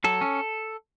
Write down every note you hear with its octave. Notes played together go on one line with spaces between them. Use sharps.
F#3 A4
C#4